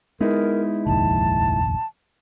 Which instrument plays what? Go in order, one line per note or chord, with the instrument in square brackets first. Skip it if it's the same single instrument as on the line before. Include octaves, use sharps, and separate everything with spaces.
[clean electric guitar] G#3 D#4 E4 [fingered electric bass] B3 [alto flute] A#4
[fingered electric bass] F1 A#1 D#2 [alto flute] A5